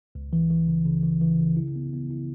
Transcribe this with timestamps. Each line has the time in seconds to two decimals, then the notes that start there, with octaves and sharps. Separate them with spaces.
0.15 C#2
0.33 E3
0.50 E3
0.68 C#3
0.86 C#3
1.03 E3
1.22 E3
1.39 C#3
1.57 E4
1.76 B3
1.93 B3
2.11 E4